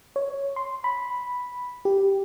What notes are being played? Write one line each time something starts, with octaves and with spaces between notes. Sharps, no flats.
C#5
C6
B5
G4